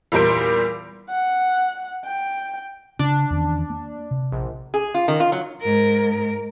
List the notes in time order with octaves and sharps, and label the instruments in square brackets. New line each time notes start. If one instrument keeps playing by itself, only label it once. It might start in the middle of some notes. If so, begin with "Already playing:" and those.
[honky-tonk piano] E2 A#2 G3 A#4 C5 D7
[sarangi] F#5
G5
[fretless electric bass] C#3 [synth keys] D4
[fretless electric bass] E2 D#3 C#4
A#3
C3
[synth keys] A#1
[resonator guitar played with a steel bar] G#4
F4
D#3
F4
F#3
[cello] G#2 A#4